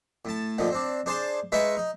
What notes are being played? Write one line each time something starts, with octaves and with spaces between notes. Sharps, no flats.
A2 A5
A#2 D3 D#3 F3
C4 D4
D4 G#4 C5 A5 C6
G#3 D#4 B4 E5 C#6
D#4